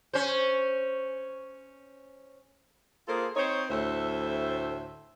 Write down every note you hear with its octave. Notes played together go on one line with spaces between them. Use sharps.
C#4 C5
A#3 F4 G#4 A4 C5
C4 D#4 C5 C#5
D2 A2 A4 C5 E5